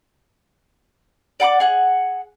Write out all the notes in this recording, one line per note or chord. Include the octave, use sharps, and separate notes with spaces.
D5 F#5 A#5 D6
G#4 F#5